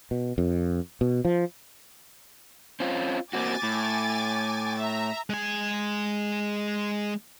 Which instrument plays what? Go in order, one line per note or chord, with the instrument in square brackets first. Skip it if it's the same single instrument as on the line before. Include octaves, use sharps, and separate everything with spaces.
[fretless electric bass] B2
F2
B2
F3
[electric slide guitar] C4 C#4 F4
[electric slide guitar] A#3 C4 F#4 [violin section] G#5 D6 A6
[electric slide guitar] A2
[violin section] E5 A#5
[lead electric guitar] G#3 G#5